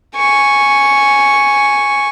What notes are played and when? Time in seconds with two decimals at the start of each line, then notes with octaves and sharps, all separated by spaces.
0.17 G#5 C#6